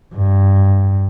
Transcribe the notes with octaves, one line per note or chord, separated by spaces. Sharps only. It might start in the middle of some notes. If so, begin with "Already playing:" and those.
G2